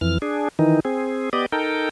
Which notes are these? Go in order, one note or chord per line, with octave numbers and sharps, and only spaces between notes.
F2 E3 F6
D4 G#4
D#3 E3 D#4
C4 G#4
B3 G4 D5 D#5
D#4 A4 A#4 G5